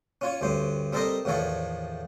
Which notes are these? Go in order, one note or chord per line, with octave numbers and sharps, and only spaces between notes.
C#4 F4 C#5
D2 G2 C#4 C5
G3 C4 A4 A#4 C5 D#5
E2 A2 D#3 F3 A4 C#5